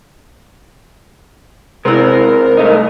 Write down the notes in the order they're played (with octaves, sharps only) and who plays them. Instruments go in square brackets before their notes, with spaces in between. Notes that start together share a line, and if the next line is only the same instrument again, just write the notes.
[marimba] C3 E4 [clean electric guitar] G#3 B3 C4 [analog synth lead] A#4
[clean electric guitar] G2 A3 D#4